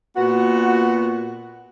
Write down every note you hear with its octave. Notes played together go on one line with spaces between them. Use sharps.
A#2 B3 F#4